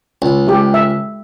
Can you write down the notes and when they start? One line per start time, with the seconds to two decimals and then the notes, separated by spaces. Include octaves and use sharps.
0.22 C#2
0.47 G#3 G4
0.74 E5